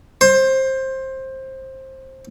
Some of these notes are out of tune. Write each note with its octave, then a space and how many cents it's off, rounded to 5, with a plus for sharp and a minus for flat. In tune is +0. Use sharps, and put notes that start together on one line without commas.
C5 +20